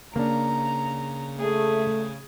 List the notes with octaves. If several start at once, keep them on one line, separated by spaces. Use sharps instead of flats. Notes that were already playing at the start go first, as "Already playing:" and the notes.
C#3 A#3 D4 A#5
A3 G#4